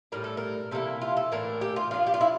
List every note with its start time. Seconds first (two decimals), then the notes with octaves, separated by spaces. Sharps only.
0.12 A2 G3 D4 A#4
0.24 A4
0.37 A#4
0.71 C3 E3 A#3 E4 A4
1.01 F4
1.17 A4
1.32 A2 E3 A#3 D4 A#4
1.61 G4
1.76 F4
1.91 F3 A3 D4 F4
2.07 G4
2.14 F4
2.21 E4